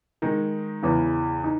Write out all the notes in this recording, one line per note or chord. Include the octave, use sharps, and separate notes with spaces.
D#3 G#3 D#4
E2 C#3 E3
D#4